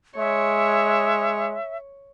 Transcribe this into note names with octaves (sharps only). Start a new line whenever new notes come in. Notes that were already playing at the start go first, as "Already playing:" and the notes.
G#3 C#5 E5